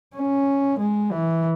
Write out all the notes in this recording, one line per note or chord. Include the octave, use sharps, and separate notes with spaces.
C#4
G#3
E3